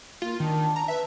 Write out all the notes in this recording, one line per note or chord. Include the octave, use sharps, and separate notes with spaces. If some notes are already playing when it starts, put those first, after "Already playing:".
A#3 F4
D#3 D4
A#5
B4 E5